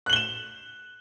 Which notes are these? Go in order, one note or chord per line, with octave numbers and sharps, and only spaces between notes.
F#6 E7 F#7 G7